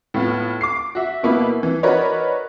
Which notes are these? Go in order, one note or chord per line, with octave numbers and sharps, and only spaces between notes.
A2 B3 F4
D6 C7
F#4 E5
B2 A#3 B3 E4
E3
D#4 F#4 A#4 B4 C#5 D5